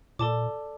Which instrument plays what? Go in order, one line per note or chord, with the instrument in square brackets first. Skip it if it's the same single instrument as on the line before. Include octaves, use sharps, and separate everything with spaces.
[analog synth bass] A#2 [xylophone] A4 D5 A5 D6